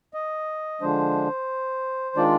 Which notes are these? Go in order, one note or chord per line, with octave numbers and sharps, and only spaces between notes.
D#5
D3 F3 G#3 D4 C5
D#3 G#3 D4 F4 D5